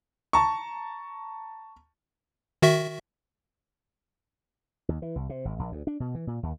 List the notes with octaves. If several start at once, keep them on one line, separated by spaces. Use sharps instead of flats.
A5 A#5 C#6
D#3 F#4 E5
D#2
E3
C2
C3
G#1
A#1
D2
D4
B2
E3
A#2
D#2